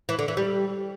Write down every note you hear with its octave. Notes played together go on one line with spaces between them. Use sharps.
E3
D3
E3
G3